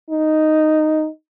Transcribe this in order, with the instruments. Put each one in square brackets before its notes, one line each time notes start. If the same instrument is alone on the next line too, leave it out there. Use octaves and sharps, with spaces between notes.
[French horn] D#4